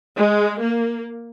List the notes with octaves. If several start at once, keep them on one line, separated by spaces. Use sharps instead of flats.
G#3
A#3